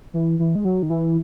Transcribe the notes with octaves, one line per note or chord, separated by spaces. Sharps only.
E3
E3
G#3
F#3
D#3
E3